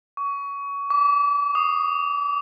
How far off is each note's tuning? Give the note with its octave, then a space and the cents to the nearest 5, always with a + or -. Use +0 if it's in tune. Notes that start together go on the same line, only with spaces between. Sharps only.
C#6 +25
D6 -35
D#6 -15